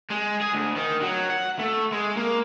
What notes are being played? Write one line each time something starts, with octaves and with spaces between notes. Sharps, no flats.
G#3
G#4
D2
D#3
F#3
F#5
A3
G#3
A#3